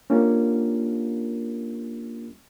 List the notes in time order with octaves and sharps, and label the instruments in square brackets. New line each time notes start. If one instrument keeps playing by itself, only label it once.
[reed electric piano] A#3 C#4 D4 F4 G4 A#4